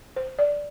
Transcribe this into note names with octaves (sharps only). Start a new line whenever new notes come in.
C5
D5